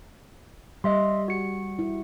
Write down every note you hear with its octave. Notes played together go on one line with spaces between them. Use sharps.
G3 D#5 E5 C6
F#4 C#7
E4